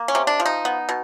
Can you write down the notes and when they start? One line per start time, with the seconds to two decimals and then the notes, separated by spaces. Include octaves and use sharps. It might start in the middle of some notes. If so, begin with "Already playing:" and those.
Already playing: A#3
0.08 C#4
0.15 C3
0.27 D4
0.40 F3
0.46 D#4
0.65 B3
0.89 B2